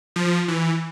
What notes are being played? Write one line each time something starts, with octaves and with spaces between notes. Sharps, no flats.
F3
E3